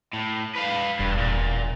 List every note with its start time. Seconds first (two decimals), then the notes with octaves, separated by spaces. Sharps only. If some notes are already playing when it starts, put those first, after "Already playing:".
0.13 A2
0.55 B4 F5
0.99 E1 G2
1.18 A#2